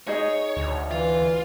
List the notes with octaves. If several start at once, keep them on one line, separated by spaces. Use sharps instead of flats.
D#4 G#4 C#5 D#5
D2
E3 F4